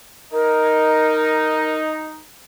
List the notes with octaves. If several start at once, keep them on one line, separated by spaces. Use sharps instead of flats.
D#4 A#4